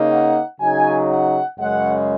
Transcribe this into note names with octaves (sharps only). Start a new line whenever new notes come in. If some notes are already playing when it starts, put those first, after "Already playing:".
Already playing: C#3 A#3 D#4
F#5
C#3 F#3 D#4 G#5
F#5
F#2 C#3 G#3 F#5